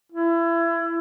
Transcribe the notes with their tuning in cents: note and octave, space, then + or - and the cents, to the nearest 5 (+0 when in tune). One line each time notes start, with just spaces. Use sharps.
E4 +30